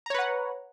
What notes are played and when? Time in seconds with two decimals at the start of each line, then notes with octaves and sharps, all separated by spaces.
0.06 A#5
0.10 C#5
0.14 B4
0.19 F#5